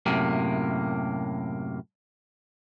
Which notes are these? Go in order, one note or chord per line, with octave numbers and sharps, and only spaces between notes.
F#2 A2 C3 A#3